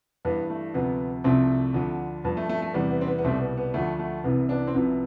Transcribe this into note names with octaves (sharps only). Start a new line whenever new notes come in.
G2 E3 G3 B3
A3
D2 C3 F3 B3
C2 C3 F3 A3 C4
D2 D3 F3
G2 F3 B3
A3
A3
A3
E2 C3 E3 G3 B3
B3
C4
B3
B3
C2 B2 G3 A3 C4
B3
B3
D2 D3 F3 A3
A3
C2 C3 E3 B3
B3 D4
C4
C2 C3 F3 B3